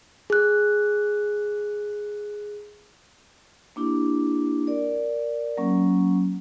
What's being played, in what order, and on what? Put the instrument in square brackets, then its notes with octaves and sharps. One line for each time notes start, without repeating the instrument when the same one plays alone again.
[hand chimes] G#4 F#6
[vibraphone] A#3 D4 E4 G4
A#4 D5
F#3 A#3 C#4